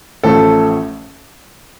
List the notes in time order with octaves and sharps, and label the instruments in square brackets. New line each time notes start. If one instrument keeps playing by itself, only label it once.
[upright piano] A1 A2 F3 A3 [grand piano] A4